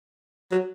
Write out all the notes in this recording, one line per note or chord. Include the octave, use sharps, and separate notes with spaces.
F#3